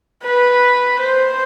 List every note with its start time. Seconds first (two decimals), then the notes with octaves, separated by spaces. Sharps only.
0.24 B4
1.00 C5